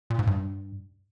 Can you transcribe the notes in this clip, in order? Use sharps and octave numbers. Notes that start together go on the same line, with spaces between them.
A#2
G#2
G2